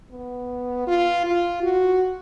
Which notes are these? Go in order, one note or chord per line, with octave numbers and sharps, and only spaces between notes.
B3
F4
F4
F#4